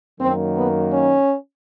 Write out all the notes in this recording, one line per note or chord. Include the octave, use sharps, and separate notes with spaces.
F#2 D#3 F#3 A#3 C4
B3
C#4